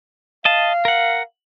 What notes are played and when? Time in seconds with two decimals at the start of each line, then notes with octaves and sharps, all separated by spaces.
0.45 D#5 F5 A5
0.85 A#4 F#5